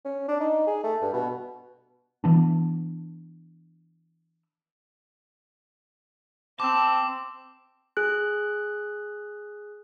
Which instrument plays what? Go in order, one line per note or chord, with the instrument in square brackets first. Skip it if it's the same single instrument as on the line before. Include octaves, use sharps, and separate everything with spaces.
[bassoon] C#4
D4
D#4
G#4
A3
G2
B2
[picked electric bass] E3 B3 D4
[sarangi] C4 [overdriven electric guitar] A5 [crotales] D6 E6
[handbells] G#4 F#6